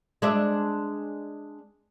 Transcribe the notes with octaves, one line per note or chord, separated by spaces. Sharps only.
G#3 D4 E5